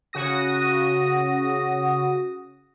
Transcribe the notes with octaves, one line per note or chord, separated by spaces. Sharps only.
C#3 F#4 D#6 A#6